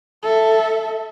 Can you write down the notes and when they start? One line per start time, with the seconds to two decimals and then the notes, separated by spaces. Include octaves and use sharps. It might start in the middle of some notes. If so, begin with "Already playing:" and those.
0.23 A4 E5